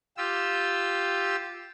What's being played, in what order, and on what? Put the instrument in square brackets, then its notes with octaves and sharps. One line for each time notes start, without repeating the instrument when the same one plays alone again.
[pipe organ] F4 G4 E6